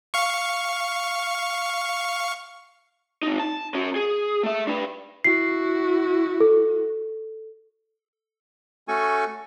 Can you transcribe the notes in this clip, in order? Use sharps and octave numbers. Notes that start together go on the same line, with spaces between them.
F5 C#6
C4 D#4
A5
C#4 F#4
G#4
A3 E5
D4 B4
E4 F#4 C7
A4
A3 C#4 F#4 A4 G#5 C#6